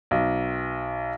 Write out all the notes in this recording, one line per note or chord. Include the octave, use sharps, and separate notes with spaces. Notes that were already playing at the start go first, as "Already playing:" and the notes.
B1